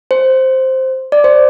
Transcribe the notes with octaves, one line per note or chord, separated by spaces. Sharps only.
C5
D5
C5